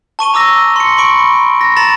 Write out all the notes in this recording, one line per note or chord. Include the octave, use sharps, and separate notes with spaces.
A5 C#6 D#7 G7
A#5 D6 E6 A#6
C6 C#7
B5 C#6 D7
A#6
A#5 B5 A6 E7